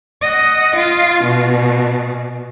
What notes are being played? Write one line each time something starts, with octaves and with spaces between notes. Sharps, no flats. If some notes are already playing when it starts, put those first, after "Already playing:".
D#5 F#5
F4
B2